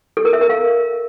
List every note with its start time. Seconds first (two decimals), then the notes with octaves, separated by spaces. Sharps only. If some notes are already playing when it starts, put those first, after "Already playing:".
0.17 A4
0.25 A#4
0.33 E5
0.41 A#4
0.49 F5